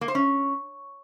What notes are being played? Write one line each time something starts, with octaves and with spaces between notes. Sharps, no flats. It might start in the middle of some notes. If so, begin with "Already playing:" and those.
A#3
C5
C#4